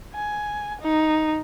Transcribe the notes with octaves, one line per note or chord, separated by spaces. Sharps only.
G#5
D#4